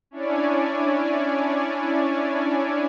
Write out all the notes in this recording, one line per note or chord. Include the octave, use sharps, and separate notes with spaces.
C#4 D4 E4 C#5 D5 G#5